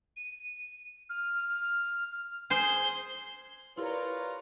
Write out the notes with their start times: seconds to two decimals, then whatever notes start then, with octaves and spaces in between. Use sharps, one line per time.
0.16 D#7
1.09 F6
2.12 F6
2.50 G#4 C5 G7
3.77 E4 F4 G4 A#4 B4 C#5 D5 A#5